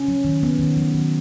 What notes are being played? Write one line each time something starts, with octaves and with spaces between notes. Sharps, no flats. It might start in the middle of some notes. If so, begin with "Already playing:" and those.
Already playing: C#4
F#3
D#3
B3
D#3
F#3
D#3